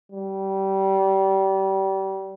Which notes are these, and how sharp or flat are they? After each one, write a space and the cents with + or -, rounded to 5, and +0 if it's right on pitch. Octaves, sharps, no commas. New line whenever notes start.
G3 -25